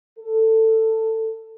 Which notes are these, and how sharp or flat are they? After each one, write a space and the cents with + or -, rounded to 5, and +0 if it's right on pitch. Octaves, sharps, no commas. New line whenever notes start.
A4 +15